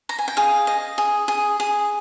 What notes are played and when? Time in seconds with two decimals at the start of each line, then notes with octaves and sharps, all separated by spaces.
0.09 A#5
0.19 G#5
0.28 G5
0.37 G#4 F5
0.67 D#5
0.98 G#4
1.28 G#4
1.60 G#4